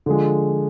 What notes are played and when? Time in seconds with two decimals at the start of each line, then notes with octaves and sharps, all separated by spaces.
0.06 D3 F3 G#3